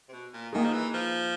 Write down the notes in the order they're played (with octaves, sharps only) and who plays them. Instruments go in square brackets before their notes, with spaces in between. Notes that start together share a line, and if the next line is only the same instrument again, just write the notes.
[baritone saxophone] C3
B2
A#2
[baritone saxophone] D#3 [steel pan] A#3 D#4 G#4
[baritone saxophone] F3
E3
F3